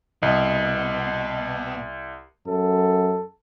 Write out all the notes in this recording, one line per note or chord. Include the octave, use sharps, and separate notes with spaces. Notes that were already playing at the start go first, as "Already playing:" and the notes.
C2 B2 D#5
F#2 A4